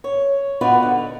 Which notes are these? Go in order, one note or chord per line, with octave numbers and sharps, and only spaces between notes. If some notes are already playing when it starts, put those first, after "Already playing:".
C#5
B3 D#4 F4 F#4 B4 D5
D3